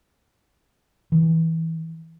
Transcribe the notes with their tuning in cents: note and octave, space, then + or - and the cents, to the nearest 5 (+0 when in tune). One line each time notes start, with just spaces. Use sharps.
E3 -20